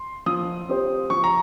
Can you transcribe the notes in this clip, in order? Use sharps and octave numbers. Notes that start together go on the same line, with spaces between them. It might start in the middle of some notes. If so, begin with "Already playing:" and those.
Already playing: C6
F3 D#6
C4 G4 C5
F3 C#6
A#5